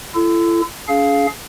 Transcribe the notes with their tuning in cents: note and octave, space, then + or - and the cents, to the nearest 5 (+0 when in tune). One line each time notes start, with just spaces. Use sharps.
E4 +45 A4 +0
C#4 +40 G#4 +25 F5 +0